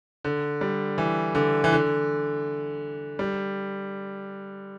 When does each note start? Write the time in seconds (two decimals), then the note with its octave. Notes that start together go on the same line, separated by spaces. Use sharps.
0.24 D3
0.61 G3
0.98 E3
1.35 D3
1.64 E3
1.73 D3
3.19 G3